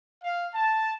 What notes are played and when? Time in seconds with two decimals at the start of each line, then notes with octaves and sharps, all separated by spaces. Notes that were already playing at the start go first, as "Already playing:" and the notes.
0.23 F5
0.54 A5